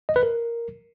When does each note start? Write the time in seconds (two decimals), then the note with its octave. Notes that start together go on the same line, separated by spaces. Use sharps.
0.09 D#5
0.16 B4
0.23 A#4